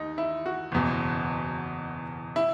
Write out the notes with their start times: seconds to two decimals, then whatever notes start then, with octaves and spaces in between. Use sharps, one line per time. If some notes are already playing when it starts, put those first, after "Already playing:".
Already playing: D#2 D#4
0.18 E4
0.46 F#4
0.72 F#1 E2 B2
2.36 E4